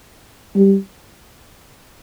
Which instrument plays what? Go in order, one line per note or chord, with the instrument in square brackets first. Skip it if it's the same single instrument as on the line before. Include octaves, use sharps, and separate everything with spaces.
[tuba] G3